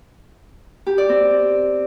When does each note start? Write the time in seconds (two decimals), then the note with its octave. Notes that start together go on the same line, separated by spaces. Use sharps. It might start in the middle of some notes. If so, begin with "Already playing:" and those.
0.86 G4
0.98 D5
1.09 C4